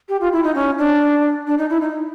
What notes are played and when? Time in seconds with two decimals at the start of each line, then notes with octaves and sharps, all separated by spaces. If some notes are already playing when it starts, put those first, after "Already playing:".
0.09 G4
0.21 F4
0.32 E4
0.44 D#4
0.55 C#4
0.78 D4
1.47 D4
1.58 D#4
1.70 E4
1.81 D#4